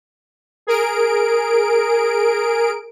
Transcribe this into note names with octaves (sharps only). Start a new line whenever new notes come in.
G#4 A#4 D7